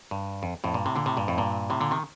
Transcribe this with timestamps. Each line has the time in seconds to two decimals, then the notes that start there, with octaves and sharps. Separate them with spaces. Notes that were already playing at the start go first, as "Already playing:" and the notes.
0.11 G2
0.43 F2
0.64 F2 A2
0.74 G2 A#2
0.86 A2 C3
0.95 A#2 D3
1.06 A2 C3
1.17 G2 A#2
1.28 F2 A2
1.38 G2 A#2
1.70 A2 C3
1.81 A#2 D3
1.91 C3 D#3